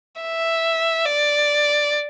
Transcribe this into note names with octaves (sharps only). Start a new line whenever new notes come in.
E5
D5